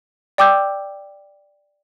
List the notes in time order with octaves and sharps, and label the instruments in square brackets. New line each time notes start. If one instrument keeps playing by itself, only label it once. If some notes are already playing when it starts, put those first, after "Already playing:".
[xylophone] D5 G5 D6 E6 G6